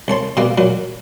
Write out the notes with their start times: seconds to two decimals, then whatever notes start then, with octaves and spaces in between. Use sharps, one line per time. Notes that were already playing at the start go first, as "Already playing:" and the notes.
0.08 C2 C#5 A5 C6
0.37 B2 G3 A#3
0.58 A#2 F#3